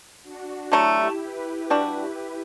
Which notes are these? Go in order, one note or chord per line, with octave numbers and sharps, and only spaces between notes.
D4 F#4
D3 F#3 A3 E4 G4
G4 B4
G3 D4 F#4